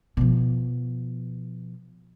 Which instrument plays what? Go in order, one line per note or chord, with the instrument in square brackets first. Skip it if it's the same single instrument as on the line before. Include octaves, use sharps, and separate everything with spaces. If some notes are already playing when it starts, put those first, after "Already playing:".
[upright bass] B2 F3